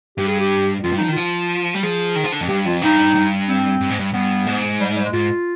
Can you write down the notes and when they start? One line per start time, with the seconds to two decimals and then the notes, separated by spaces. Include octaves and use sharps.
0.18 G2 G4
0.28 G#4
0.40 G4
0.83 F2 F4
0.92 G2
0.97 F3 D#4
1.08 D#3
1.12 F3 F4
1.74 G3
1.83 F3 G#4
2.16 D#3
2.24 F3
2.32 D3
2.41 F2
2.48 G2 G4
2.65 F2 F4
2.82 G2 D#4
3.15 G2
3.48 C4
3.81 G2
3.90 G#2
3.99 G2
4.13 G2 B3
4.47 G#2
4.80 G3
4.96 G3
5.04 G#3
5.12 G#2 F4